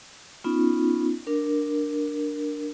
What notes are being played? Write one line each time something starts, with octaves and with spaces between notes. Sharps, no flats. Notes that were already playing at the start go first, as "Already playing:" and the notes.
B3 C#4 D#4 F4
D4 A#4